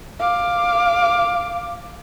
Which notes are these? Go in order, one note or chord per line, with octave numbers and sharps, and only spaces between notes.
F5 D6